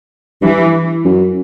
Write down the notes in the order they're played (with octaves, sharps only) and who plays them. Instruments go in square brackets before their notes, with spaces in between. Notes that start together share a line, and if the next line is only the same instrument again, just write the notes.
[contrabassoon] G2 [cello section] E3
[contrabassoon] F#2